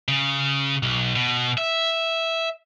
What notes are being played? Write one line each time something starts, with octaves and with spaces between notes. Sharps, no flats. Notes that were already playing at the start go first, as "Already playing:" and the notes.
C#3
B1
B2
E5